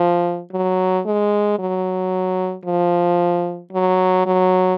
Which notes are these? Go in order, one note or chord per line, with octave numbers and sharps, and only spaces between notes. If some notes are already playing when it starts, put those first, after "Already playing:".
Already playing: F3
F#3
G#3
F#3
F3
F#3
F#3